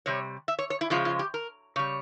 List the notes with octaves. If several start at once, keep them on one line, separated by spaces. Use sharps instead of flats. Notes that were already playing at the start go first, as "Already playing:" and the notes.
C3 G3 C#5
E5
C#5
C#5
E4
C#3 F3 G#3 F4
F4
G4
A#4
C#3 G3 C#5